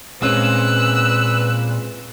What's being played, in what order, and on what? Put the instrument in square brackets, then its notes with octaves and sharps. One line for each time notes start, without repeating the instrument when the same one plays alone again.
[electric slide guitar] A#2 F4 [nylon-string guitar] G#3 C4 C#4 [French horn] B4 [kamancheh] E6 F#6